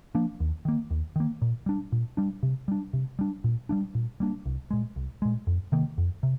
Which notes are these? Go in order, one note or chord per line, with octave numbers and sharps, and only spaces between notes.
F3 A#3 D4
D#2
D#3 A#3
D#2
D#3 A#3
A#2
G3 D4
A#2
G3 D4
C3
G3 D4
C3
G3 D4
A#2
G3 A#3 D4
A#2
G3 A#3 D4
C2
A#2 G#3
C2
A#2 G#3
F2
C3 D#3 A#3
F2
C3